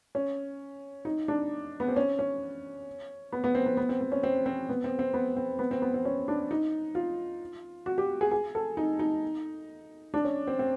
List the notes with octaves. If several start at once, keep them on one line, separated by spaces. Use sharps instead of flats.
C#4
D#4
D4
B3
C4
C#4
C#4
B3
B3
C4
B3
B3
C4
C4
C#4
C4
C4
B3
C4
C4
B3
C4
B3
C4
B3
C4
C#4
D4
D#4
F4
F#4
G4
G#4
G#4
A4
D#4
D#4
D4
C#4
C4
C4